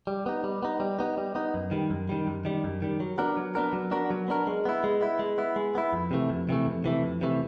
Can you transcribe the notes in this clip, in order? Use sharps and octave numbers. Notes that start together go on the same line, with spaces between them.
G3
B3 D#4
G3
B3 D#4
G3
B3 D#4
G3
B3 D#4
F#2
D#3 G3
F#2
D#3 G3
F#2
D#3 G3
F#2
D#3 G3
F#3
B3 D4 F#4 A#4
F#3
B3 D4 F#4 A#4
F#3
B3 D4 F#4 A#4
F#3
B3 D4 F#4 A#4
G#3
B3 E4
G#3
B3 E4
G#3
B3 E4
G#3
B3 E4
F2
C3 E3 A3
F2
C3 E3 A3
F2
C3 E3 A3
F2
C3 E3 A3